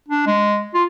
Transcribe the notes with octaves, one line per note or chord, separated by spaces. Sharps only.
D4
G#3
F4